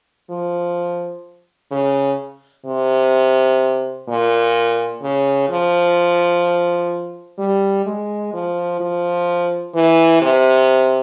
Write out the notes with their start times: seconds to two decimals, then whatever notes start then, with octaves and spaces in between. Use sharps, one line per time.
0.30 F3
1.71 C#3
2.66 C3
4.09 A#2
5.02 C#3
5.49 F3
7.39 G3
7.86 G#3
8.34 F3
8.80 F3
9.74 E3
10.22 C3